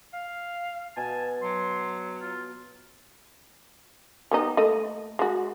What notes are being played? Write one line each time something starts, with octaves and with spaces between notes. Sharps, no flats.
F5
B2 G#5 A5
F#3 C6
F4
G3 B3 D#4
A3 A#3 D#5
G#3 F#4